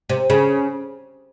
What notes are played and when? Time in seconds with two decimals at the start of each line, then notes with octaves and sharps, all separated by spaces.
0.09 C3
0.30 C#3